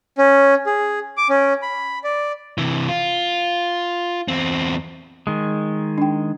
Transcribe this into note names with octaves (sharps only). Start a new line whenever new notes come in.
C#4
G#4
D6
C#4
B5
D5
C3 E3
F4
E2 C4
D#3 G#3
D4 G5